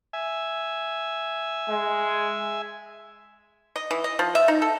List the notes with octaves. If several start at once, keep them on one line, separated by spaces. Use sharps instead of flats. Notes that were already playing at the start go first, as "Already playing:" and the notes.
E5 G#5
G#3
D#5
E3
D#5
F3
E5
D#4
A4